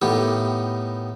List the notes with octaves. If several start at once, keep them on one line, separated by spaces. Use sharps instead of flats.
A2 D#3 B3 G4